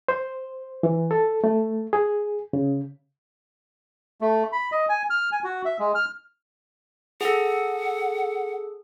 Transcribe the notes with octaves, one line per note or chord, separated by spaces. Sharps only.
C5
E3
A4
A3
G#4
C#3
A3
B5
D#5
G#5
F6
G#5
F#4
E5
G#3
F6
G#4 A4 F#5